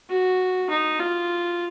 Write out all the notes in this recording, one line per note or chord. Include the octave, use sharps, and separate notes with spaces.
F#4
D#4
F4